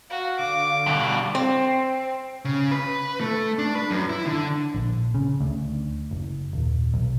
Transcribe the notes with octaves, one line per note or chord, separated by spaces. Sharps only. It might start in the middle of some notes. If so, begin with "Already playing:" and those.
F#4 F5
D3 D6
G2 B2
C4
C#3
B4
A3
D4
B4
F#2
E4
D3
A#1
C#3
D2
F#1
D#1
B1